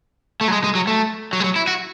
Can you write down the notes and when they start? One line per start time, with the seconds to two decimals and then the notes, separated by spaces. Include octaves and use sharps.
0.41 A3
0.48 F#3
0.52 G#3
0.64 G#3
0.75 F#3
0.87 A3
1.33 F#3
1.40 G#3
1.44 F#3
1.56 E4
1.68 F#4